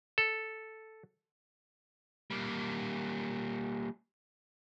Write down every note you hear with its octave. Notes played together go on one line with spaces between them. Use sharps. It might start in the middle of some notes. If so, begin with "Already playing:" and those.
A4
G3 A#3